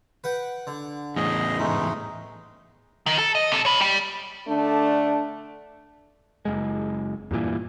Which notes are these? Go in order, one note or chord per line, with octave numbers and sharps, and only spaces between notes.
B4 F#5 G5
D3
E2 A2 G#4 D#5
G#2 G#3 A3 D#4
D#3
A4
D#5
C3 A4
C#5 B5
G3 G5
D3 A3 D4
F#1 G#3
E2 G2 A#2 E3